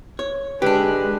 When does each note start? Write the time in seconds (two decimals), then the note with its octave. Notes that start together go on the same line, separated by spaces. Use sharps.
0.19 C#5
0.62 D3 G#3 D4 G4 B4